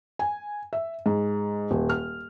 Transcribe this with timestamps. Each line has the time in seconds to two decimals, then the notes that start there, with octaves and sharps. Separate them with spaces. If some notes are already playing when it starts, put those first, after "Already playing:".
0.19 G#5
0.73 E5
1.06 G#2
1.71 D#1
1.89 F6